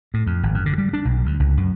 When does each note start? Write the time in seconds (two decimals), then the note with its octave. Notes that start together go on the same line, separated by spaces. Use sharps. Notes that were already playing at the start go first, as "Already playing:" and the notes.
0.14 A2
0.26 F2
0.43 G#1
0.54 F#2
0.66 D3
0.78 G3
0.93 D4
1.05 B1
1.26 D2
1.40 C#2
1.57 F#2